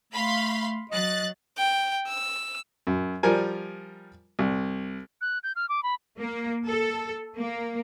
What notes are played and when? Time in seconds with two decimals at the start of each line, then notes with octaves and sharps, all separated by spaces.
0.13 A3 F5 B5 C6
0.91 F#3 D#5 F#6 A6
1.58 G5
2.08 E6
2.87 F#2
3.23 F3 G3 A#4 G#5
4.39 C2
5.21 F#6
5.43 G6
5.56 F6
5.69 D6
5.83 B5
6.18 A#3
6.67 A4
7.36 A#3